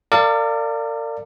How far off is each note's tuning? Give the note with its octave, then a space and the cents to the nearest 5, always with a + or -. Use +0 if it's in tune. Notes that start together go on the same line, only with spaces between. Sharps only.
A#4 -40 D5 +10 F5 -15